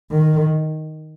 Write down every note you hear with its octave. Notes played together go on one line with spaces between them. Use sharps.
D#3